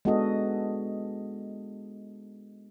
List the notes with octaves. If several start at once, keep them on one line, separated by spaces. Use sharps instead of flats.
G#3 B3 D4 F#4 A4 D#5